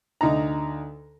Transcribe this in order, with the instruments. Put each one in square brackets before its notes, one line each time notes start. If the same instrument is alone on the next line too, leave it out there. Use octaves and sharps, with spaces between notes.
[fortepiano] D2 D#4 A#5